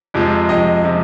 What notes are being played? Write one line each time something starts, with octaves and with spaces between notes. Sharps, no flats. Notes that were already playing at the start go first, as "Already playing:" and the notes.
F2 C3 F3 G#3
F2 C3 F3 G#3 D#5
C3 F3 G#3